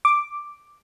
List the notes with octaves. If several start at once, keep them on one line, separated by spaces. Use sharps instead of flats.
D6